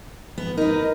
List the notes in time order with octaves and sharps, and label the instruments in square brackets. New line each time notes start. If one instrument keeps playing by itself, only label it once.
[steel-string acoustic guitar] B3
[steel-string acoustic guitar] D#4 B4 [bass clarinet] A#4